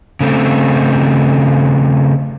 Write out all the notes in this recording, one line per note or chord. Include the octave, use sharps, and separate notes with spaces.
C#3 A3 C4